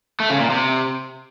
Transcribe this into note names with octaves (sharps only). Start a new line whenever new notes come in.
A3
C#3
A#2
C3